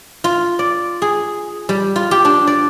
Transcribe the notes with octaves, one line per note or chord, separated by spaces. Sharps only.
F4
D5
G#4
G3
F4
G4
D4
D5